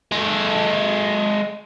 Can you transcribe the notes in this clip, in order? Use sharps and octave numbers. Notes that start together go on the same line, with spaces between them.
G#3 A4